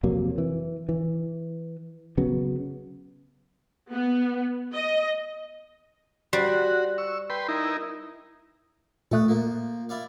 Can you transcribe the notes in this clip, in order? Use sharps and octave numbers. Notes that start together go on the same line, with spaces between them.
F2 C3 F#3 A#3
E3
E3
C#3 F#3 B3
B3
D#5
G3 F#4 C5
C#6 E6
B4 G5 C6
D#4 E4 A#4
A#2 A3 A4 D#6 F#6
F3 A#3
E4 D5 F5